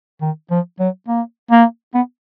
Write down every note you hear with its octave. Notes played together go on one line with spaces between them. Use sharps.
D#3
F3
F#3
A#3
A#3
B3